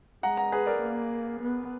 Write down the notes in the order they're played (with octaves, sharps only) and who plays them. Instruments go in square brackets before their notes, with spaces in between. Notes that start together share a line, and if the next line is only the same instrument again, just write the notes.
[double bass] G#3 [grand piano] F#5 A#5
[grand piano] F#5 A#5
G#4 B4
A#4 D5
[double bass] A#3
B3